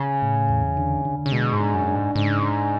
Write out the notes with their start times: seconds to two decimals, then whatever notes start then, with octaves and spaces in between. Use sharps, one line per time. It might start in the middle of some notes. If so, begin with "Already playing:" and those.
Already playing: C#3
0.22 A2
0.49 E2
0.77 D3
1.05 D3
1.26 C#3
1.32 B2 G#3
1.53 G#2
1.60 D4
1.74 F#2
1.88 D4
1.95 G#2
2.15 G#2 C#3
2.43 D4